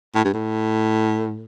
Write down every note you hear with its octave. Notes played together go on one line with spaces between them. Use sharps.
A2
G2
A2